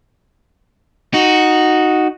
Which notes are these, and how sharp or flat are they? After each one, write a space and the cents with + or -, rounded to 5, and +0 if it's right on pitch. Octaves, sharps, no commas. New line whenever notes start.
D#4 +0 F#4 +0